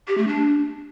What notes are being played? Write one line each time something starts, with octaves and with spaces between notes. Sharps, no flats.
G4
A3
D4